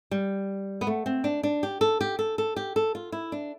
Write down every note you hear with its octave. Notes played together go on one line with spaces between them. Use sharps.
G3
B3
A3
C4
D4
D4
G4
A4
G4
A4
A4
G4
A4
F4
E4
D4